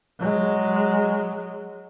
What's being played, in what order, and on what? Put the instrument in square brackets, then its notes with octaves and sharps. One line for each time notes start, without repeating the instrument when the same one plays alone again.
[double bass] F#3 G#3